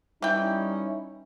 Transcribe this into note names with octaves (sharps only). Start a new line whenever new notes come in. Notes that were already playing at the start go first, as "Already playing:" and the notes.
E3 G3 C#4 D#4 E4 G5